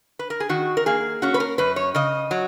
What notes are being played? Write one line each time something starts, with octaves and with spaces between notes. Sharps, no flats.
B4
A#4
G#4
D#3 F#4
A#4
A#3 G#4
C#4 F#4
B4
A#4
F#2 B4
C#5
C#3 D#5
F#3